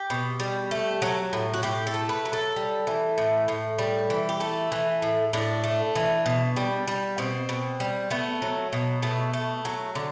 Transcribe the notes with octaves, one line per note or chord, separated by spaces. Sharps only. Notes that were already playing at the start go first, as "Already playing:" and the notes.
Already playing: G4
B2
G3
A3
F#3
A2
F#4
A2 G4
A4
A3
B4
F#3
A4
G3
E3
A2
A2
G3
E3
G4
A3 A4
E3
A2
A2 D4
A3
E3
B2
G3
G3
B2 C4
B2
G3
A3 B3
F#3
B2
B2 A3
A3
F#3
D3